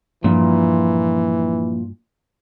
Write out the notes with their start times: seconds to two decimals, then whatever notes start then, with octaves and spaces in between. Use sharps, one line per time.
0.24 G2 A#2 E3 F3 A#3 D4